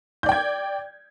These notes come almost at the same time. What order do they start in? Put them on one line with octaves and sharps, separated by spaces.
G6 D5 G5 G#6